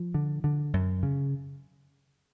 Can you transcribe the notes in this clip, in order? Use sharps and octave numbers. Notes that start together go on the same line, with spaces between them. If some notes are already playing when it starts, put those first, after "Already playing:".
Already playing: F3
D3
D3
F#2
C#3